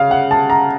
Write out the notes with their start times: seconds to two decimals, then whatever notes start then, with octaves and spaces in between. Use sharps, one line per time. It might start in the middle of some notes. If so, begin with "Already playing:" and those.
Already playing: C#3 F5
0.11 F#5
0.31 A5
0.50 A#5